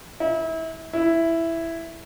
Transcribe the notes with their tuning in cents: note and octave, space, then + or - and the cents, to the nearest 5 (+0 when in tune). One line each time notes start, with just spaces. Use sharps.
E4 -30
E4 +5